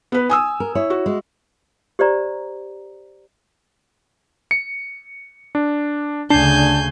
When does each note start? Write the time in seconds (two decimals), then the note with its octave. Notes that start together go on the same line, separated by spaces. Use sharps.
0.12 B3 B4
0.30 G#5 D#6 E6
0.60 A#4
0.75 E4 C#5
0.90 F#4
1.06 G#3
1.99 G4 C5 D5 A#5
4.51 C#7
5.55 D4
6.30 D2 C#3 D4 G#5 A5 G6 C7